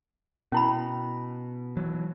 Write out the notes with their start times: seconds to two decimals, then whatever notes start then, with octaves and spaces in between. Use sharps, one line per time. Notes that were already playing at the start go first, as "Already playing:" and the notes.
0.52 B2 C#4 E4 B5
1.77 E3 F#3